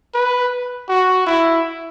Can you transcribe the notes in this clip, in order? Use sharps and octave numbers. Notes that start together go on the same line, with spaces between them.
B4
F#4
E4